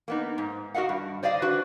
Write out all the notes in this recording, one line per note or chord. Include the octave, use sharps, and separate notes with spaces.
A#3 B3 D#4
G#2
F#4 A#4 D#5 F5 F#5
G2
C5 D5 D#5 F5
D4 F#4 B4 C5